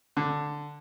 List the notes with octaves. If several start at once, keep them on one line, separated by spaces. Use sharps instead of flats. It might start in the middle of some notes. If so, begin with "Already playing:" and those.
D3